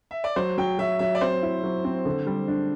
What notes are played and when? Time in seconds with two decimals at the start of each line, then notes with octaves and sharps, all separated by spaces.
0.11 E5
0.24 D5
0.36 F#3 C5
0.58 F#3 G5
0.79 F#3 E5
0.99 F#3 E5
1.15 D5
1.21 C4 C5
1.42 E4
1.64 F#3
1.84 C4
2.05 D3
2.27 G3
2.48 D4